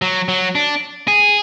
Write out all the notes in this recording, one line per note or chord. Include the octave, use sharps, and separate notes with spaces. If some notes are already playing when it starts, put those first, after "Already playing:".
F#3
F#3
D4
G#4